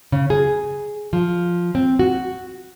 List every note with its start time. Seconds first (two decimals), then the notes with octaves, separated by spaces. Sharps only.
0.12 C#3
0.30 G#4
1.13 F3
1.75 C4
1.99 F#4